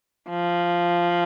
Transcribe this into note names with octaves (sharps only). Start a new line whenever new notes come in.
F3